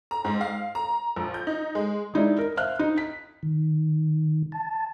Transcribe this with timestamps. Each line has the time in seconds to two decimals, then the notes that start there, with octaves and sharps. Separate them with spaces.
0.11 A#5
0.25 G#2
0.41 F5
0.75 A#5
1.16 A#1
1.34 G6
1.47 D#4
1.75 G#3
2.14 G#3 D#4 E4 D5
2.38 A#4
2.57 C5 E5 F5 F6 F#6
2.79 D#4
2.98 B6
3.43 D#3
4.52 A5